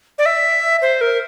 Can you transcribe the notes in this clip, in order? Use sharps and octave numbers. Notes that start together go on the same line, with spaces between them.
D5
E5
C5
A#4